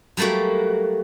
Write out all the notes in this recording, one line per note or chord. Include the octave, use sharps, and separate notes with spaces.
F#3 G3 A3 A#3 F#4